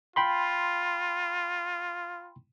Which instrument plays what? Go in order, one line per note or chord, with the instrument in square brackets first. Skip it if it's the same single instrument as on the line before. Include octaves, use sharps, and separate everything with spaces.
[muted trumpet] F4 [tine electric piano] G5 B5 C6